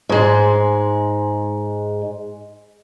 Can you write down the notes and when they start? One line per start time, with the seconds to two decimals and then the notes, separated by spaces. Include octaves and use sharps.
0.09 G#2 G#3